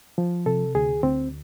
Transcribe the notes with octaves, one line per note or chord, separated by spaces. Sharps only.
F3
C3 A4
D2 G#4
D2 C4